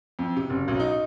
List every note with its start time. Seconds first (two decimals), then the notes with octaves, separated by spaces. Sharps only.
0.19 F2
0.36 C3
0.50 F#1
0.68 B1
0.80 D#4